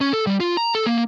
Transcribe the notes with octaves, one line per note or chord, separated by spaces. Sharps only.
C#4
A4
G3
F4
A#5
A4
A#3